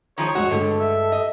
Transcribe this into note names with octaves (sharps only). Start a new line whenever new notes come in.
D#3 F3 G#3 C#5
E2 G#3 F#4
G2 D3 G#3 G4 A4
E5
D#5